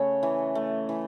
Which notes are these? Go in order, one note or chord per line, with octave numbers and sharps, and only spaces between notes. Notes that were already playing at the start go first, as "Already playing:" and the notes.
Already playing: C#3 A3 C#5
E3
A3
E3